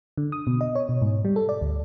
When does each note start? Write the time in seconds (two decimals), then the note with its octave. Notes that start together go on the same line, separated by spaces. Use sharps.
0.18 D3
0.32 D#6
0.47 B2
0.61 D#5
0.75 C#5
0.89 B2
1.02 G#2
1.25 G3
1.36 A4
1.49 D5
1.61 D2